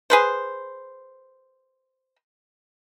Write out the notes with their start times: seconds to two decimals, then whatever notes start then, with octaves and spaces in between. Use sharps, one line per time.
0.10 G#4 B4 C5